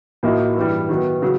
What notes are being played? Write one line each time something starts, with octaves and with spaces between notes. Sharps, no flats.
A2 F3 A#3 D#4 F#4
G2 E3 G3
D#3 F#3 B3
C#3 F#3